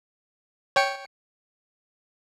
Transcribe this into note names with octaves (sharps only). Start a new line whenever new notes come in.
C#5 G5 C#7